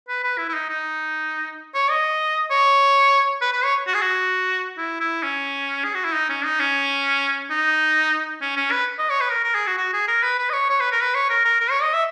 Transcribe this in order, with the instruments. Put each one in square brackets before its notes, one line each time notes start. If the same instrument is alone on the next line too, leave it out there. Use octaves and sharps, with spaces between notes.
[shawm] B4
B4
E4
E4
D#4
D#4
C#5
D#5
C#5
B4
B4
C#5
F#4
G#4
F#4
E4
E4
C#4
G#4
F#4
E4
D#4
C#4
D#4
C#4
D#4
C#4
C#4
B4
D#5
C#5
B4
A#4
A#4
G#4
F#4
F#4
G#4
A#4
B4
B4
D#5
C#5
C#5
B4
A#4
B4
C#5
A#4
A#4
A#4
C#5
D#5
E5